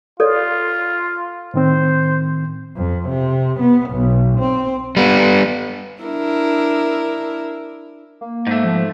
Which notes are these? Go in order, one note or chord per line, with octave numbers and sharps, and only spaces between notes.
F4 A4 C#5 D5
A2 D#3 C4 C5
F2
C3
B3
B1
C4
G3 B3
D4 E4 A#4
A#3
G#2 A3
F3